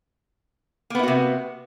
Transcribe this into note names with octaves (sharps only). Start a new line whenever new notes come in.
C3 A#3 B3 E4 F#4